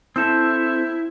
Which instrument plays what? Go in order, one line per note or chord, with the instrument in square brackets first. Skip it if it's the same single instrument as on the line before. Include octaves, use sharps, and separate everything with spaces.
[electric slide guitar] C4 A4 [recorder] E4